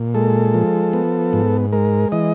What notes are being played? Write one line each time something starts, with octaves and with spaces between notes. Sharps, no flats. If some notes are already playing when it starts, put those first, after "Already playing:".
Already playing: A#2
G#3 A4
F3
B3
G#2
G#3 A#4
E3 D#5